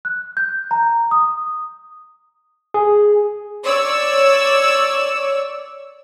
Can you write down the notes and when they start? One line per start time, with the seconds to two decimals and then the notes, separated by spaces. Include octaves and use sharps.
0.05 F#6
0.37 G6
0.71 A#5
1.11 D#6
2.74 G#4
3.65 C#5 D5 E6